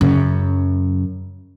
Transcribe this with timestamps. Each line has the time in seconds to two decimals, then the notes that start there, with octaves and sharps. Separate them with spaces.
0.01 F#2 C#3